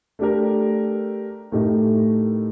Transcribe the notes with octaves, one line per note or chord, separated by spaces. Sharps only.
A3 D4 G4 A#4
A2 A3 D#4 G4 A#4